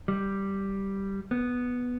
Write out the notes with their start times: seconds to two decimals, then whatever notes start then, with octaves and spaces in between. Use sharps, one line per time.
0.08 G3
1.31 B3